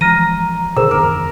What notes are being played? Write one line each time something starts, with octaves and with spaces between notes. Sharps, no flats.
E3 F3 G#3 A#5 F6 A#6 D#7
B2 D3 D#3 G#4 A#4 C5 E6
F#1 E2 D#3 A#4 D6